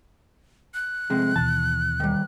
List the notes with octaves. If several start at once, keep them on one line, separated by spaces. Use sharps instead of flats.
F#6
F2 C3 G#3
D#2 B2 E3 A5
D#3 G3